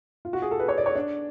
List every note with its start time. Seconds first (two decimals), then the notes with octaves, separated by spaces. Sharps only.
0.25 F4
0.33 F#4
0.42 G#4
0.51 A4
0.60 B4
0.68 C#5
0.78 D5
0.86 C#5
0.95 D4